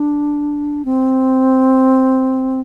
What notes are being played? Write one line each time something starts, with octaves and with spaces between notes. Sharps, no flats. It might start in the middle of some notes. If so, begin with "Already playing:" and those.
Already playing: D4
C4